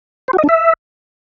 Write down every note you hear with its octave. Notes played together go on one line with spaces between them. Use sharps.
C5
F#4
D#5
D4
E5